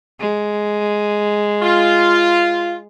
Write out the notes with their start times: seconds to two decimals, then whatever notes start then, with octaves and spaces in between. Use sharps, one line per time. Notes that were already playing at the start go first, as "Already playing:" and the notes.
0.20 G#3
1.62 F4